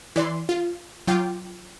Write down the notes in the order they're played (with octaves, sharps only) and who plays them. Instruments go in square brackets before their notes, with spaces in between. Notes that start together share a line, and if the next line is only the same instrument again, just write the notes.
[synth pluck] E3 D5 C6
F4
F#3 F4 G5 D6